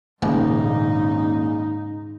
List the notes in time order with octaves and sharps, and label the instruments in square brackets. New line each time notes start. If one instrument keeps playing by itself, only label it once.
[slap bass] D#1 [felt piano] A#1 C#3 [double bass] G#2 D#4